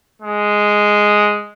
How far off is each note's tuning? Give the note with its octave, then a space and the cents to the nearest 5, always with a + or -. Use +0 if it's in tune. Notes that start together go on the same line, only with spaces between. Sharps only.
G#3 +0